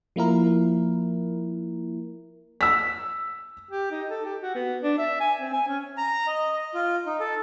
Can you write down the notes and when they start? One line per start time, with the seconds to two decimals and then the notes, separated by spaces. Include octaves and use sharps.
0.16 F3 A#3 E4 A#4
2.61 E6 B6
3.71 G4
3.91 D#4
4.09 A4
4.25 G4
4.41 F#4
4.55 B3
4.83 D4
4.98 E5
5.20 G#5
5.40 C4
5.53 G#5
5.68 C#4
5.98 A#5
6.27 D#5
6.74 F4
7.06 D#4
7.20 A4